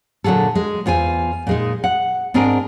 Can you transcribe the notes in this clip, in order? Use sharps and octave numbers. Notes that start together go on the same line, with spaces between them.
A#2 D3 F#3 G#4 A4
G#3
E2 F4 C5 G#5
A#2 G#3 D#4
F#5
G#2 C4 D4 G#4 A#4